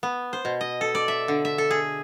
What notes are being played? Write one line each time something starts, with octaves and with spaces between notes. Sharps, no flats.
B3
C5
B2
D#5
A4
D5
E5
D3
E5
A4
G#4